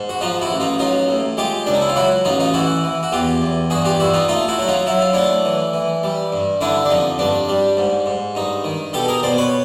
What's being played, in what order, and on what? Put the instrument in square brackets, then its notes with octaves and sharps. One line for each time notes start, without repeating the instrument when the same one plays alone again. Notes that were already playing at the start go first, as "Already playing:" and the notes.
Already playing: [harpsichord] G#2
F#4
F3 D#4 F4
E4 F#4
A1
D#4 F4
F#3 D#4 F4
A2
G#3 F4 G4
C#2 D4
D#4
E4
F4
F#3 E4 F#4
A1 D#4 F4
D#4 F4
E3 E4 F#4
E3
F#4
E2 F4 G4
E2
G2 F#4 G#4
F4 G4
G2 E4 F#4
D#4 F4
A3 D#4 F4
E4 F#4
F#3 E4
D#4 F4
F#3 E4
F4
A3 D4 E4
E3
E3
G3
G2
D3 D4 E4
D4
F2 D#4
G2 D4
G3
G#2
G#2
G2 D#4
D#3
B2 G4 A4
G#4 A#4
B2 C5 D5
B4 C#5